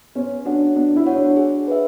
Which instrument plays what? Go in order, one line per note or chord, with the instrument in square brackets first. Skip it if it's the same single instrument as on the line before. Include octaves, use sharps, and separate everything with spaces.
[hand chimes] B3 [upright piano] C#4
[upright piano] D4 [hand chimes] F#4 C#5 F#5
[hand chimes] B3 [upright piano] D4
[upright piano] E4
[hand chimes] F#4 C#5 F#5
[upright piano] D4
[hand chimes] G#4
B4 E5